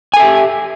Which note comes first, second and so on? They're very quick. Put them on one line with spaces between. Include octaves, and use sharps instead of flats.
G#5 A4 E5 G4